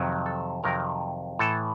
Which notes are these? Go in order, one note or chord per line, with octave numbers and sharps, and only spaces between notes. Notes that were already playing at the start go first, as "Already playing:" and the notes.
Already playing: F2 C3 D#3 F#3
A4
F2 C3 D#3 F#3 A#4
A2 E3 A4